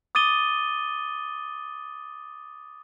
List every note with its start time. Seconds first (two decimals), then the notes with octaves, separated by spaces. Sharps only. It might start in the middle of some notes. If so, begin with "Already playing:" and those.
0.15 D6 D#6 A6 D#7 G7